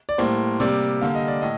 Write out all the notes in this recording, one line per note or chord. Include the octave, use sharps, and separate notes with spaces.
D5
A2 G3 A#3 C5
C3 G3 A#3 D5
D3 G3 A#3 F5
D#5
D5
A2 D#5